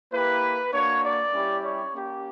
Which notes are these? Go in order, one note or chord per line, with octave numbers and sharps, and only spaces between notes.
A#3 E4 G4 B4
A#3 D4 F#4 C#5
D5
G3 C#4 E4 G4
C#5
A#3 C#4 G4